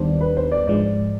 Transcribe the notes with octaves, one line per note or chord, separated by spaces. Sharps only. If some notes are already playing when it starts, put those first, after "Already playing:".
Already playing: D#2 D#3 G3 B3 D4 C5
B4
C5
D5
G#2 F3 G#3 D5